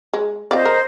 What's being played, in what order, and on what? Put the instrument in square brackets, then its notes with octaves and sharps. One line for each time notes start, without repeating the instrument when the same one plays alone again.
[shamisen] G#3
[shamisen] C4 F4 D5 [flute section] C5 D#5
[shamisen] A#4